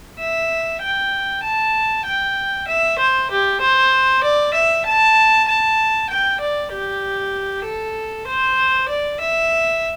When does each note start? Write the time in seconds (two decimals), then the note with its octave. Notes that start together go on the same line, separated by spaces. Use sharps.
0.19 E5
0.81 G5
1.43 A5
2.05 G5
2.68 E5
2.99 C5
3.31 G4
3.61 C5
4.23 D5
4.54 E5
4.85 A5
5.48 A5
6.10 G5
6.40 D5
6.72 G4
7.65 A4
8.27 C5
8.88 D5
9.20 E5